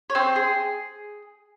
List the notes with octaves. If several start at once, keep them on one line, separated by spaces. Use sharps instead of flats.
C#5
C4 C5
G#4